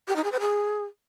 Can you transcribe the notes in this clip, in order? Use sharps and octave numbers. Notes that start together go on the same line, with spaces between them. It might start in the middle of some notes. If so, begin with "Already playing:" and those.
G4
D#4
G#4
C5
G#4